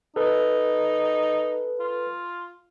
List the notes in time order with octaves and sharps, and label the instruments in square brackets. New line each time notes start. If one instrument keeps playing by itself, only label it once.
[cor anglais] D#4 [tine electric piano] A4 B4
[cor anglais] F4